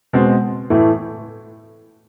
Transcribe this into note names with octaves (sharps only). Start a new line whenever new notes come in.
B2 G#3 C4
A2 E3 A3